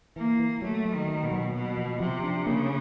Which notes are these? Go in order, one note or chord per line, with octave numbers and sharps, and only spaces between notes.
E3 A#3
E3
F#3 A3
F#3
D#3
B3
B2
F#3
B2 A#3
F3
C3 F3
D4
C#3 A#3